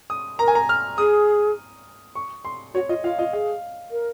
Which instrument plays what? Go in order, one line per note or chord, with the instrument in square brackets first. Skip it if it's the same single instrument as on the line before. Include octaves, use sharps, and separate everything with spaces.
[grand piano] D#6
[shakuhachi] A#4 [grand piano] A#5
[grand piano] G#5
A#5
F6
[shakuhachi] G#4 [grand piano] D#6
[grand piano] C#6
C6
[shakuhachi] F#4 [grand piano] C#5
[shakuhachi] F4 [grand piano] D#5
[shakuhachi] F4 [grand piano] F5
[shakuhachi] F4 [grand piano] D#5
[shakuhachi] G#4 [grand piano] F5
[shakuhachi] A#4